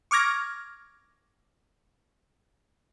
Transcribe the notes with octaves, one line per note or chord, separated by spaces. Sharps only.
C#6 D6 F6 G#6 A#6